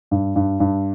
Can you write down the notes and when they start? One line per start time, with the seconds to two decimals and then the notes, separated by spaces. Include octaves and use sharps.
0.11 G2
0.36 G2
0.60 G2